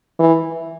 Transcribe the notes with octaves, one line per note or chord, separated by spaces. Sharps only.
E3